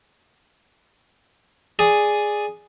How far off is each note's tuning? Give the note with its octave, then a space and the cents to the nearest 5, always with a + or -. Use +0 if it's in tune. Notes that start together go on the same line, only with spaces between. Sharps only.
G#4 +0 D5 -5 D#6 +0